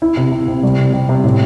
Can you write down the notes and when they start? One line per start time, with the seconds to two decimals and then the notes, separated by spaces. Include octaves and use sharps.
0.02 E4
0.17 C3
0.32 C3
0.48 C3
0.63 G3
0.78 C3
0.93 G3
1.09 C3
1.24 A2